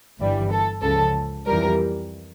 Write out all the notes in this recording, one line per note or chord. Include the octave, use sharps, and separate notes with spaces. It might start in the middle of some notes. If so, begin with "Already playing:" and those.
G1 G2 E3 G3
A4
C#2 C#3 F3 A4
F2 E3 G3 A#4